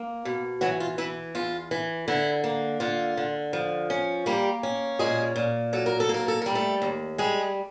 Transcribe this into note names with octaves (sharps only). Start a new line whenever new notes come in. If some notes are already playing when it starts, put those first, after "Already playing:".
Already playing: A#3
B2
E3 F#3 F#4
F4
E3 E4
E2 F4
E3
D3 E4
A#3
D3 F4
D3
F3
C#4
G3 A#3 G4
C#4
A#2 G#3 G#4
A#2
F#3 A4
A#4
A4
A#3
A#4
A4
G3 A#4
A3 A4
D#2
G3 G#3 G#4